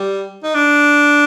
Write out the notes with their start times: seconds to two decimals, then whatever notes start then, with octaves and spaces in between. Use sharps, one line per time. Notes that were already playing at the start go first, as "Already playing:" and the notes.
Already playing: G3
0.43 D#4
0.54 D4